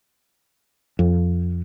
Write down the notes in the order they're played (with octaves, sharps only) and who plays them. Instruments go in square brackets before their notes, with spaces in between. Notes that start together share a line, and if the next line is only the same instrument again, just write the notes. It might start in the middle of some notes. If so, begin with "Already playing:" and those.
[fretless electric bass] F2